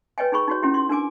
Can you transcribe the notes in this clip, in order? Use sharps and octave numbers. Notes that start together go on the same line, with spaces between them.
B4 C#5 D#5 G5 G#5
D#4 G#4 B5 C#6
D#4 F#4 C#5
C#4 E4 G4
C6
D4 A#4 G#5 D6